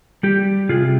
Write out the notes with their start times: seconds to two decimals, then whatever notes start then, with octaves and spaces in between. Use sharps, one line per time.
0.23 G3 G4
0.69 C3 F4 G#4